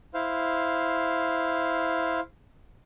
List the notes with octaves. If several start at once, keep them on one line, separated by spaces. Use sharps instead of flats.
E4 C5 F5